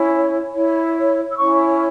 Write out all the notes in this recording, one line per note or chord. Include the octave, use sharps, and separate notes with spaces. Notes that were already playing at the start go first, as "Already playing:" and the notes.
Already playing: C#4 E4 C#5
E4 C#5
E6
C#4 E4 C#5 C#6